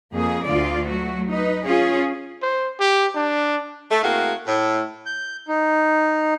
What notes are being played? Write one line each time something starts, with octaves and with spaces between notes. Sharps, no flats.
F2 A#3 G#4
D2 D3 F4 D5
F#3 A3 F#4
D#4 B4
C#4 F4 G#4 C#5
C5
G4
D4
A3
A2 A#3 C4 F#4 G#4 F5
A2
G6
D#4